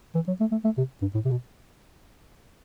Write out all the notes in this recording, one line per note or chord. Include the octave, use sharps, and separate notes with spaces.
E3
F#3
A3
A3
A3
C3
G2
A2
C3
B2